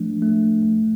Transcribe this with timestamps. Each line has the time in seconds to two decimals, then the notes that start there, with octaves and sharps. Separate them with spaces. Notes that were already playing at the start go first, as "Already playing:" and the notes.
Already playing: F3 A3 D4
0.22 A3
0.63 A3